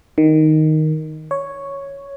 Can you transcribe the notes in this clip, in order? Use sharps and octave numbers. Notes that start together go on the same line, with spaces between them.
D#3
C#5